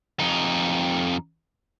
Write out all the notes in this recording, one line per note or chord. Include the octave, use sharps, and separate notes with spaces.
F2 D#4